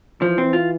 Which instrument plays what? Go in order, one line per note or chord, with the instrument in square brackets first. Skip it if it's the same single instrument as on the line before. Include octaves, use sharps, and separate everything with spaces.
[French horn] E3 [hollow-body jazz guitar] F3
[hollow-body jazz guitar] C4
F4